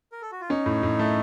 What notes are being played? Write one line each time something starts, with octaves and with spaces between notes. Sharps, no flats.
A#4
A4
F#4
F4
C#4 D#4
A2
A2
A3